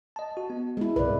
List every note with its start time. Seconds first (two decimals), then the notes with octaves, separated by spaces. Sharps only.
0.16 D#5 A5
0.37 F#4
0.50 B3
0.77 G#3 E4
0.96 C2 G#2 C3 B4 D5